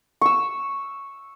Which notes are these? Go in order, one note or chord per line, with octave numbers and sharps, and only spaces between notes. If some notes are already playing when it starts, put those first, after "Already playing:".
C#6 E6